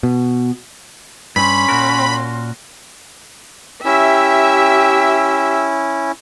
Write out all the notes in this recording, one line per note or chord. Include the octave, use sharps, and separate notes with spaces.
B2
G2 C#4 B5 C6
A#2 F#4 A#4
C#4 E4 G4 E5